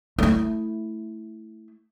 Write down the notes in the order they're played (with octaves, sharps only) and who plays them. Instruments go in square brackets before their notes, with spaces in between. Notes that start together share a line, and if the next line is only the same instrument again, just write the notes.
[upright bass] A3 E4